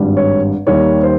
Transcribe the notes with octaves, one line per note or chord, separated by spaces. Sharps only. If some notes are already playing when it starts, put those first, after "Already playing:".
Already playing: G#1 G2 G3
C#5
D#2 D#3 G3 C#5
C5